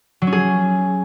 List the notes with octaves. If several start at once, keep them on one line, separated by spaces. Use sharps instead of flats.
F#3
C#4
G#4